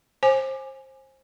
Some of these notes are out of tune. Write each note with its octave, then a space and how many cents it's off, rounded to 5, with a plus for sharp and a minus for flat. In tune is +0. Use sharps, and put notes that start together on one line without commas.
C5 +25 G#5 +0 D6 +25